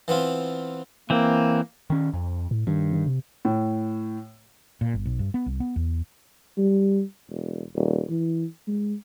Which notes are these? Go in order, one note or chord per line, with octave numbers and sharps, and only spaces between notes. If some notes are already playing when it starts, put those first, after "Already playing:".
E3 B3 C4 F4
E3 A#3 C4
D#3 C#4
F2
A2
G2 D#3
D#3
C3
A2
A#2
G1
B1
G2
B3
C2
B3
E2
G3
E1
D#1
E3
G#3